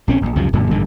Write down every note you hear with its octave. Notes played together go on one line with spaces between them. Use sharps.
A#1 C4 C#4
D1 A#1
C#2 F#2 C3 F3
E1 F#2 A#2 D3
A1 G2 D3 D#3